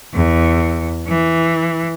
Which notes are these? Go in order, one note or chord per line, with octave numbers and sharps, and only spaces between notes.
E2
E3